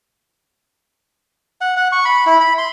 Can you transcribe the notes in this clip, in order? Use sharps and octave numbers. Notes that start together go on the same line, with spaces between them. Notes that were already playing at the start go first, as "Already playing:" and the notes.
F#5
F#5
C#6
B5
E4
B5
C6